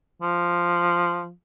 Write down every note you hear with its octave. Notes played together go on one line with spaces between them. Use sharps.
F3